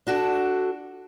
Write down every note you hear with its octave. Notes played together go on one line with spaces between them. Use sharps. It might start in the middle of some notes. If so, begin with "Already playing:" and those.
D4 F#4 A4